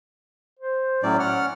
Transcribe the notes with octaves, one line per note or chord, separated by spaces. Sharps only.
C5
A2 F#3 C#4 D5
F#5 F6